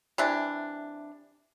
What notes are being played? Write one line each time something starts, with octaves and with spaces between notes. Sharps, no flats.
C3 E3 D4